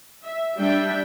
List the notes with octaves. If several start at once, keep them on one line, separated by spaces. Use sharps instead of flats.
E5
G3 D4 E5 G5